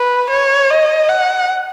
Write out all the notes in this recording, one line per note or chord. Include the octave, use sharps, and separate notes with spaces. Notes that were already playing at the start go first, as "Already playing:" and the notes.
Already playing: B4
C#5
D#5
F#5